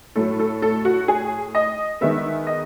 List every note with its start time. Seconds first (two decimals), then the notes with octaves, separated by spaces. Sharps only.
0.16 A2 F#3 A3 A4
0.39 A4
0.62 A4
0.85 F#4
1.08 G#4
1.55 D#5
2.01 D#3 G#3 B3 E5
2.47 D#5